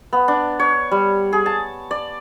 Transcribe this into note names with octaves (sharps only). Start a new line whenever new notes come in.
B3
D4
C#5
G3
G#4
A5
D5